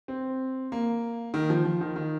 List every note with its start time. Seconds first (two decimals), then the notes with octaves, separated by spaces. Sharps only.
0.08 C4
0.72 A#3
1.34 D#3
1.50 F3
1.65 F3
1.81 D#3
1.96 D#3